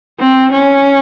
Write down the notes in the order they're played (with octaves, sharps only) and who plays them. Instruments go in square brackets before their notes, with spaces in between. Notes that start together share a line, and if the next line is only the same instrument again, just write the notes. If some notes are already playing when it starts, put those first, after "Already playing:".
[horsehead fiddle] C4
C#4